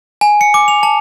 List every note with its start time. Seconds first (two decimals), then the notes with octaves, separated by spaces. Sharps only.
0.21 G#5
0.41 C#7
0.54 D6
0.68 F7
0.83 A5